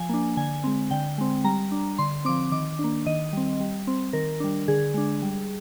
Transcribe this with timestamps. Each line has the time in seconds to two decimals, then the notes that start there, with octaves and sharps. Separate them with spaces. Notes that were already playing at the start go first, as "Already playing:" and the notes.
Already playing: F3 G#5
0.09 A#3 D4
0.37 D3 G#5
0.64 G#3 C4
0.91 D3 G5
1.18 G#3 C4
1.44 G3 A#5
1.72 D4
1.98 D3 C6
2.25 F3 C4 D6
2.52 D#3 D6
2.79 A#3 D4
3.06 D#3 D#5
3.33 G3 C4
3.60 G3
3.87 C4
4.13 D#3 A#4
4.40 G3 D4
4.68 D3 G#4
4.94 G#3 D4
5.22 G3